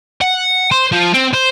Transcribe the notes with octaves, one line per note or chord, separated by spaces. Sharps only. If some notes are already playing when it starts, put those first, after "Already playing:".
F#5
C5
F3
C4
C5